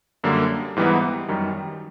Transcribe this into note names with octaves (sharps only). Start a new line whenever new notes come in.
F#2 D3 G3 A#3
G#2 E3 G3 B3 D#4
F#2 D#3 G3